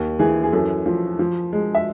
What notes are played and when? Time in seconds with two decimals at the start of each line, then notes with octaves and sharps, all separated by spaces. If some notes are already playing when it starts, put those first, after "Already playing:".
Already playing: D#2
0.19 E3 G#4
0.43 G#4
0.53 F#2 A4
0.86 F3
1.19 F3
1.53 G#3
1.75 E5